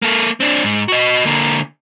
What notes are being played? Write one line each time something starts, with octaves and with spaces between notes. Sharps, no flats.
A#3 A4
C4 D4
G#2
F#4 D#5
D3 A#3